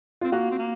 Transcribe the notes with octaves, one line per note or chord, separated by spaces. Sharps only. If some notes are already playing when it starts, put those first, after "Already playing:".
C4 F4
A#3 F#4
C4
A#3